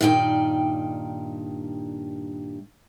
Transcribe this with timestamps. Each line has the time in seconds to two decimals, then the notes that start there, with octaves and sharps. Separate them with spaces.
0.01 G2 A#2 D#3 D#4 D5 G5